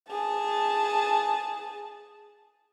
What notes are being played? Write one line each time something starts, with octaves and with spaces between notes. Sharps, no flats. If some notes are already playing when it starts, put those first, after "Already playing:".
G#4 A5